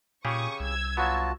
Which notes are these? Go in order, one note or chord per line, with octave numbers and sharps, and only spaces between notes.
A#2 C#3 G4 G#4 C#6 D#6
C2 E6 G#6
F#3 B3 F4 F#4 A5